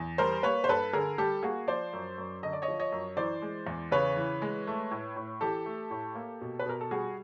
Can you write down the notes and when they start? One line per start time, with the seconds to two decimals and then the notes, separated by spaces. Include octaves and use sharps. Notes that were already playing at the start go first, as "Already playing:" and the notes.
Already playing: E2
0.18 G3 A#4 C5
0.43 A#3 B4 C#5
0.64 C5
0.68 G2 A4 B4
0.93 D3 G#4 A#4
1.18 G3 G4 A4
1.43 A#3 F#4 G#4
1.68 F3 C5 D5
1.93 F#2
2.18 F#2
2.43 D3 D#5
2.53 D5
2.62 C#5 D#5
2.68 F3
2.80 C#5 D#5
2.92 F#2
3.17 E3 C5 D5
3.42 G#3
3.67 E2
3.91 C#3 B4 C#5
4.17 E3
4.42 G#3
4.67 A3
4.91 A2
5.16 A2
5.41 E3 G4 A4
5.66 A3
5.91 A2
6.15 A#3
6.41 B2
6.60 B4
6.66 B2 A#4
6.81 A4
6.91 G3 F#4 G#4